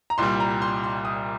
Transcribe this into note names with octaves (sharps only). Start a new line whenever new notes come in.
A#5
C2 A#2 G3 C6
A#5
C6
C6
D#6